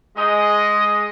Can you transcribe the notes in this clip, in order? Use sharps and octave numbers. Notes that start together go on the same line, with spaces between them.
G#3 D#5